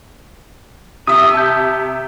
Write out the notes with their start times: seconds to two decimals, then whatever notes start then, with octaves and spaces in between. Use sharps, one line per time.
1.07 C3 E5 D#6
1.34 A5 G6